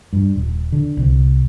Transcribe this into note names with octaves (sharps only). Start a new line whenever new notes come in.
G2
D#1
D3
C2